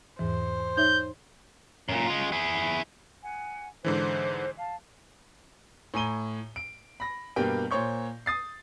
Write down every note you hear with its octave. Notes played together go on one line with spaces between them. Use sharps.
E2 G#2 E3 C5
D#4 C#5 E5 G6
F#2 A#2
G#3 F4
E4 G#4
F#5 G#5
G#2 D3 E3 C5
F5 A5
A2 G#5 A#5 D#7 G7
D7
B5 A#6
G2 B2 A#3 G4 B4 G5
A#2 C5 C#5 C#6 G6
D#6 A6 C7